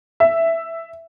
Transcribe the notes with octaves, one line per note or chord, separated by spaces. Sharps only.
E5